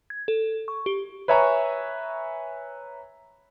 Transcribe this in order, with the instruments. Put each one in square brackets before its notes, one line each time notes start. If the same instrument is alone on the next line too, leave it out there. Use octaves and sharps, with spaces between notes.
[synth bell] G#6
A4
C#6
G4
[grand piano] B4 C#5 E5 G#5 A#5 C#6